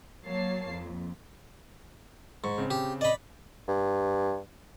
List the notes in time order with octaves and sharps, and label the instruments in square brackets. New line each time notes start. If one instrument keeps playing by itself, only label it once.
[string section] F#3 A#3 C#5 A5 C7
F2
[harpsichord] G#2 [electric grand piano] C#6
[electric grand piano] C#3 C4
[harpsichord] G4
[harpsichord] D5 B5 [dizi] D#5
[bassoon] G2